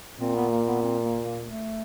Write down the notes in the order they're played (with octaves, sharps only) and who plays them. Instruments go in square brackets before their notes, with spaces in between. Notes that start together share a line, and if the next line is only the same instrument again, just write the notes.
[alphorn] A#2 [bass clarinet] C4
[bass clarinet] B3
A#3
B3
C4
A#3
A#3
A3